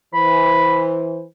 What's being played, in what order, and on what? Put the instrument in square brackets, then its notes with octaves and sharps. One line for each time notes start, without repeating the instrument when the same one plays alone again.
[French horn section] E3 C5 [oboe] B5